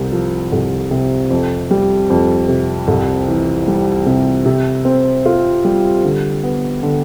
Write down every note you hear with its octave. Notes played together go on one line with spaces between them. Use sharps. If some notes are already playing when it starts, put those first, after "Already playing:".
Already playing: C2
F3
C2
C3
F2
G3
F2
C3
C2
E3
G3
C3
C3
C4
F4
G3
D3
B3
D3